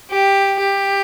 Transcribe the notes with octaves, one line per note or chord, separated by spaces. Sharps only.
G4
G4